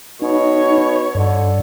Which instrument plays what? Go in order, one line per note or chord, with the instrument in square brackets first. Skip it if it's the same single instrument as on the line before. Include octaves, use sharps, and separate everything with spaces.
[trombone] B2 [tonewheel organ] D#4 [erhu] C#5
[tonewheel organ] G2 [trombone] D3